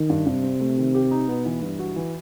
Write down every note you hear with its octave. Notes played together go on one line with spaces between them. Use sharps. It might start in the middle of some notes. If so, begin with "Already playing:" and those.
Already playing: D#3
G2
G2 C3
C4
A3
D#3
G4
D#4
B2 B3
E3
G2 E3
F#4
E3